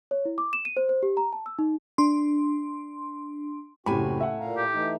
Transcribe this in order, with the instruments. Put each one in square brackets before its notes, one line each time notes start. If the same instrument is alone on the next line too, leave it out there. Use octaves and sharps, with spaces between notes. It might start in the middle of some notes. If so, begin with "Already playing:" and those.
[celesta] C#5
E4
D6
E7
D#7
C5
C5
G4
A#5
A5
E6
D#4
[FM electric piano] D4 C6
[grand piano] F#1 G4 B5 [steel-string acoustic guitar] A2 G#5 [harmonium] C4 F#4
[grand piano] E5 F#5
[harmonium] A#2 F5 A#5
[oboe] G4
[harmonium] E3 A3 D#4